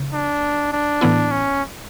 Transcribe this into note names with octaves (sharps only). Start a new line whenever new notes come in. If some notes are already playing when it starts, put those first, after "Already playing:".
Already playing: C#3
D4
D4
A2 E3 B3 E4
C#4